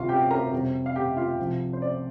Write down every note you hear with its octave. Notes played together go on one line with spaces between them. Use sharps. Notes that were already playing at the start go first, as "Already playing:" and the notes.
Already playing: D2 C3 G3 F4 F5
G4 G5
A#4 A#5
F2 C3 G3
F5
G4 G5
F4 F5
C2 C3 F3
C5
D5